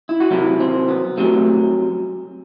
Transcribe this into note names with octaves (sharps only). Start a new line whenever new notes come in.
E4
F#4
C2 C3 F#3 E4
C4
B3
C2 C3 F#3 A3